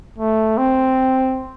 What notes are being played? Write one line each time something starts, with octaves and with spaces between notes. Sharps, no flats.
A3
C4